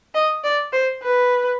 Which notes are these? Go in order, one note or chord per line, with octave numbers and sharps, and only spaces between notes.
D#5
D5
C5
B4